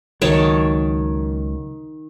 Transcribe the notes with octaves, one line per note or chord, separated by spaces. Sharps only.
C#2 D#3 F#3 C#5 A5